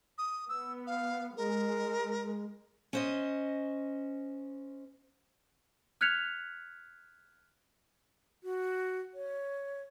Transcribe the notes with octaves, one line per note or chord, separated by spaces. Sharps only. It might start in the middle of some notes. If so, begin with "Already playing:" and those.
D#6
B3 E6
F5
G#3 A#4
C#4 C5 D#5
F6 F#6 G#6 B6 C#7 F7
F#4
C#5